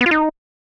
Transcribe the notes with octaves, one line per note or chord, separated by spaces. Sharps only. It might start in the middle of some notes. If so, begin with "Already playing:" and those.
B3
F4
D#4